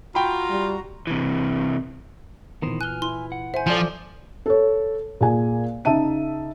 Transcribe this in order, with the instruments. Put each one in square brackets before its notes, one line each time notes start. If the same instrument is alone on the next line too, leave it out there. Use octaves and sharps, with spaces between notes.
[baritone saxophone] F4 [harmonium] F#4 A#5 [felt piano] G5 B5
[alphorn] G3
[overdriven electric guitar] C3 E3
[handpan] A#2 E3 [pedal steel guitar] D#3 B3 C5
[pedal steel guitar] G#5 F6 [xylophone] F#6 G7
[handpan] E4 [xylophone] C6
[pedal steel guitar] F#5
[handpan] C5 [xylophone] E5 G#5
[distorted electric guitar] F3 [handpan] F4 D5 [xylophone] A4 G#5
[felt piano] A4 C#5
A#2 G#4 G#5
C#3 D#4 E5 A5 D#7